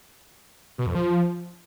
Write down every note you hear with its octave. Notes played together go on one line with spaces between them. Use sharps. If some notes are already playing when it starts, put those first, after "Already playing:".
B2
F2
F3